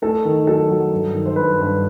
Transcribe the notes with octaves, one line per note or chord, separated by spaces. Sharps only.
A3 A4
D#3
F#3 A4
F#3
G2
D#3
C5
G2 B4
G2